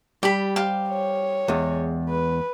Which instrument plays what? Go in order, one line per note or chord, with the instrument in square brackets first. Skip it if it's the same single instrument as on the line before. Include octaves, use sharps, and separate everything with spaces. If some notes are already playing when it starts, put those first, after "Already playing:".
[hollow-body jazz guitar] G3 [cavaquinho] G4 B5
[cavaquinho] G4 C5 F5
[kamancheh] C#5
[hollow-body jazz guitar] E2 G#3
[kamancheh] B4